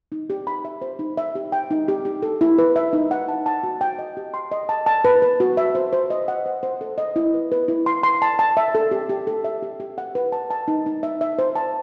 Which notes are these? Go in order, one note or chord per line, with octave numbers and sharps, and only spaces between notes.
D#4
G4
B5
E5
C5
D#4
E5
G4
G5
D#4
G4
G4
A4
E4
B4
E5
D#4
F#5
A5
A5
F#4
G5
D#5
G4
C6
D#5
A5
A5
B4
B4
F#4
E5
C5
C5
D#5
F#5
C5
C5
A4
D#5
E4
B4
B4
E4
C6
C6
A5
A5
E5
A4
G4
G4
A4
E5
G4
G4
F#5
B4
A5
A5
D#4
D#4
E5
E5
C5
A5